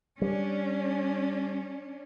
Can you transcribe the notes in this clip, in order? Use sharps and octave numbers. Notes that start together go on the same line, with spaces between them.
G3 C#4 D4